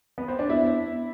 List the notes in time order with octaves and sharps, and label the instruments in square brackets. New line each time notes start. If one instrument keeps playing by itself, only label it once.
[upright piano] B3
C4
D4
[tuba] B3 [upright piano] E4